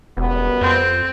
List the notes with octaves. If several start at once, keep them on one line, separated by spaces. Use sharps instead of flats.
E1 F#2 G3 B3
F2 C4